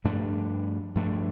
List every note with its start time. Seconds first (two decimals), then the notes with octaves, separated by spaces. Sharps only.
0.04 G2 F3 A3 D4
0.95 G2 F3 A3 D4